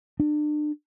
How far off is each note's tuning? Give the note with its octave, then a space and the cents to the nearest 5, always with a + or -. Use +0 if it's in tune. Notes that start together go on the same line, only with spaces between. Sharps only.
D4 +35